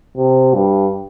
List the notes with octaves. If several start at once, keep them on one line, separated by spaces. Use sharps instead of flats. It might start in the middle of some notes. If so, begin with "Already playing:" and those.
C3
G2